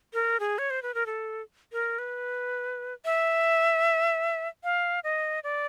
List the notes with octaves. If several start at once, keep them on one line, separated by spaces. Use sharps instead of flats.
A#4
G#4
C#5
C5
B4
A#4
A4
A#4
B4
E5
F5
D#5
D5